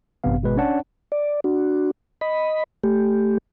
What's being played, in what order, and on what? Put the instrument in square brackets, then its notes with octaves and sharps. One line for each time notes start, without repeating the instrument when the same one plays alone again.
[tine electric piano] A1 G2 C3 B3 F5
G#1 B2 G#3 B4
C#4 D4 C#5 D5 F#5 A5
[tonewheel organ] D5
D4 F#4
D#5 B5
A3 G4